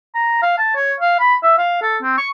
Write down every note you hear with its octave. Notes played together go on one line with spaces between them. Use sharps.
A#5
F5
A5
C#5
F5
B5
E5
F5
A4
C4
C#6